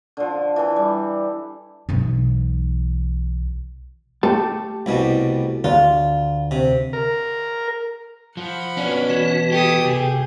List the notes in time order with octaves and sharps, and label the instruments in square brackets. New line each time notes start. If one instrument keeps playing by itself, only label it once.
[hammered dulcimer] D3 F3
E3 A4
G3
[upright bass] B1 E3
[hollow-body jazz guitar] A3 G4 A5
[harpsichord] C2 B2 G3
[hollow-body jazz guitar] D2 [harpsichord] F4
[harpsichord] C3
[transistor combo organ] A#4
[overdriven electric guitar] F3 [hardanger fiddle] F#5 B5
[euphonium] B2 [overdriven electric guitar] C#4 D4
[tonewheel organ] E3 F#4
[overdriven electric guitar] G4 [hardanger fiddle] A4 D#6
[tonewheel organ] C3 [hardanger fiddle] G#4